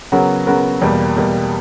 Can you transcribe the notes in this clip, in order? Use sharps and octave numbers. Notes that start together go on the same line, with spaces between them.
C#3 F#3 B3 F#4 A#4
C#3 F#3 B3 F#4 A#4
E2 B2 G3 A#3
E2 B2 G3 A#3